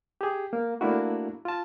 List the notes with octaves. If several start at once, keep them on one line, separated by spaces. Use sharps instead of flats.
G4 G#4
A#3
A3 A#3 D4 E4 F#4
F4 A5